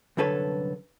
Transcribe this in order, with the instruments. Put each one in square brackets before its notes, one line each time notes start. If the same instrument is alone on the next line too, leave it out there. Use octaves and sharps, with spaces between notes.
[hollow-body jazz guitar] C2 F#2 D3 A4 B4 C#5